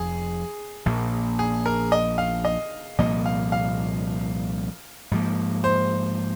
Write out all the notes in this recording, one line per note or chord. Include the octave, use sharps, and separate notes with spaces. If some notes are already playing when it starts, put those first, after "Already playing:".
Already playing: F1 F2 F3 G#4
A#1 A#2 A#3
G#4
A#4
D#5
F5
D#5
C2 A#2 F3 A#3 D#5
F5
F5
G#2 F3 A#3
C5